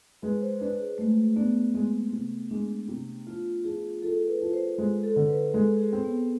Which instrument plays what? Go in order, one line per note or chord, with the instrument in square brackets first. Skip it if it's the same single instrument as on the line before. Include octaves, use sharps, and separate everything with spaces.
[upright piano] G#3 [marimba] B4
[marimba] C5
[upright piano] D4 [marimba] B4
[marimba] G#4
[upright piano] G#3 [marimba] A3
[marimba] B3 [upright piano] D4
[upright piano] G#3 [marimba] C4
[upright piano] C3
[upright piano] G#3 [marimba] D4
[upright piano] C3
[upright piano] F3 [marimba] F4
[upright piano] F3 [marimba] G#4
[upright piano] F3 [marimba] A4
[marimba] B4
[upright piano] F3
[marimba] C5
[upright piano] G#3 [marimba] C5
[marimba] A4
[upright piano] D3
[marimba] B4
[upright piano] G#3 [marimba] A4
[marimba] G#4
[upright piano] C4
[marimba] B3